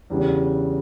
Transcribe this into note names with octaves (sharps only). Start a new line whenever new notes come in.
E2 C#3 G3 D4